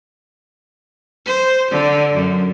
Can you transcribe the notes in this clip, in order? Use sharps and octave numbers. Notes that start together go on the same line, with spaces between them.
C5
D3
F#2